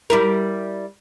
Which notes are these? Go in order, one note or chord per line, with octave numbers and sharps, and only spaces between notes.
G3 E4 A#4